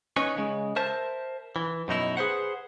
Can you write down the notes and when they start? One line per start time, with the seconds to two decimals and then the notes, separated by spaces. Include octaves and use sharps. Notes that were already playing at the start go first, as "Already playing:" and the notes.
0.16 C#4 D#4 B4 C#5
0.36 C#3 G#3
0.76 A#4 C5 E5 A5
1.56 E3
1.88 F#2 B2 D#4 E4
2.17 G#4 B4 C5 F#5